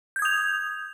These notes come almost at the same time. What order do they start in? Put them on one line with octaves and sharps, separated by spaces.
G6 G#6 D#6 F7